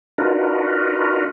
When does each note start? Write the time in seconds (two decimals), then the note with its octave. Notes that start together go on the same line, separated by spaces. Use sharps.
0.18 D4 D#4 F4 F#4 A#4 B4